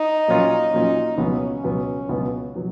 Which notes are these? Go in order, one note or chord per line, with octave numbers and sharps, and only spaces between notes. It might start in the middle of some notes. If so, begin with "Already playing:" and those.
Already playing: D#4
A#2 F#3 C#4 F4
A#2 F#3 C#4 F4
C#2 B2 F#3 B3 C#4
C#2 B2 F#3 B3
C#2 B2 F#3 B3
B2 F#3